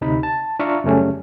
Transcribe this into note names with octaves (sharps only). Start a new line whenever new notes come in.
D2 C3 D#4 B5
A5
D4 F4 E5 F5 A#5 C#6
F#2 C#3 G3 A3 C#4